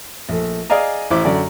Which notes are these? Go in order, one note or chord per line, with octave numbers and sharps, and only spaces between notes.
A#1 A3
G#4 D5 D#5 F5 G#5 A#5
A1 E4 C5 D6
F#2 D3 D5